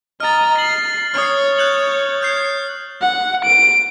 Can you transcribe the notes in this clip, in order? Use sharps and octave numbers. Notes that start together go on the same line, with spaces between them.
D#5 A#5 F6 A6
C7 F#7
C#5 D#6 F6
F#6 G6 F#7
F6 G6 C7
F#5
D7